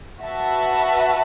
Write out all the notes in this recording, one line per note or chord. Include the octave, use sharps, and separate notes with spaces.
F#4 B4 E5 A5